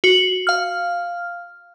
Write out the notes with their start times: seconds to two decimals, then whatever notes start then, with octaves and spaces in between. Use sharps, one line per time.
0.04 F#4
0.47 F5 F6